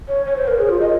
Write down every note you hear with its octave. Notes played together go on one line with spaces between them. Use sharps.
C#5
C#5
C5
A#4
G#4
F4
D#5